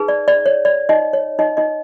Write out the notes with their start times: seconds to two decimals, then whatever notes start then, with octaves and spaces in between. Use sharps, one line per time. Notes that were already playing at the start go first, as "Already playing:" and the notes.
Already playing: D#4 G#4 B4
0.08 D5
0.28 D5
0.46 C#5
0.65 D5
0.89 D#4 D#5
1.13 C#5
1.39 D#4 D#5
1.57 D#4 D#5